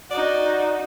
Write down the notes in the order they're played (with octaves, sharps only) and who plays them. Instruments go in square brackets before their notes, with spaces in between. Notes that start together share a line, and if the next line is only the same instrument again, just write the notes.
[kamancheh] D#4 F#4 [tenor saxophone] D5